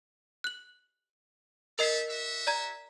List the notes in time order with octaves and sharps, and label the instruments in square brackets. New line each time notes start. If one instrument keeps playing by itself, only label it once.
[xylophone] F#6 F#7
[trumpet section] D#4 A4 E5 [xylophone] A#4 D#5 C7
[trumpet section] F#4 E5
[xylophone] D5 A#5 G#6